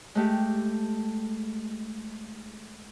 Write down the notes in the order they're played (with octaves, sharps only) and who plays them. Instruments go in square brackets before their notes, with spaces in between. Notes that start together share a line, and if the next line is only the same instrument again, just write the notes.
[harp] G#3 A3 G4